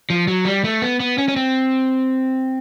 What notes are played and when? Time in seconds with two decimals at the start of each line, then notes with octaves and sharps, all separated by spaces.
0.10 F3
0.28 F#3
0.45 G3
0.64 A3
0.82 B3
1.00 B3
1.18 C#4
1.28 C#4
1.36 C4